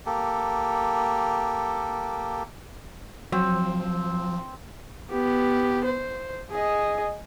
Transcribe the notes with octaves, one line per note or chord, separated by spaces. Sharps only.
A#3 G4 A4
F3 F#3 C4
B3 G4
C5
G#4 D#5